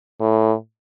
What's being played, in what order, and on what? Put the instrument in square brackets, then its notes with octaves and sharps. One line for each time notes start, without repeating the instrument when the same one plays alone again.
[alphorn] A2